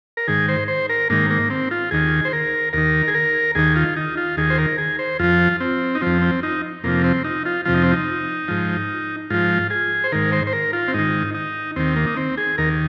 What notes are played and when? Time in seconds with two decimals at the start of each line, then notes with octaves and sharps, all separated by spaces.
0.17 A#4
0.28 G#2 D#3 G#4
0.49 C5
0.68 C5
0.89 A#4
1.10 G#2 D#3 A#3
1.30 A#3
1.50 C4
1.71 F4
1.91 D#2 D#3 G#4
2.25 C5
2.33 A#4
2.73 D#2 D#3 A#4
3.08 G#4
3.14 A#4
3.55 D#2 D#3 G#4
3.76 F4
3.96 D#4
4.17 F4
4.37 D#2 D#3 G#4
4.50 C5
4.58 A#4
4.78 G#4
4.99 C5
5.19 F2 F3 F4
5.60 C4
5.95 D#4
6.01 F2 F3 C4
6.22 C4
6.43 D#4
6.84 F2 C3 F3 A#3
7.04 C4
7.24 D#4
7.45 F4
7.65 F2 C3 F3 F4
7.74 D#4
7.83 C4
7.91 D#4
8.48 G#2 F3
9.30 G#2 F3 F4
9.70 G#4
10.04 C5
10.12 G#2 D#3 A#4
10.32 C5
10.47 C5
10.53 A#4
10.73 F4
10.88 C4
10.94 G#2 D#3 D#4
11.34 D#4
11.76 D#2 D#3 C4
11.96 A#3
12.07 D#4
12.17 C4
12.38 G#4
12.58 D#2 D#3 A#4